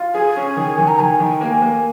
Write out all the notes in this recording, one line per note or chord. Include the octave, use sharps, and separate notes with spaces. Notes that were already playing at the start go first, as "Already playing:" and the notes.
Already playing: F4
G#4 G#5
C#4
D#3
D#3
A#5
D#3 G#5
D#3
A#3
A#3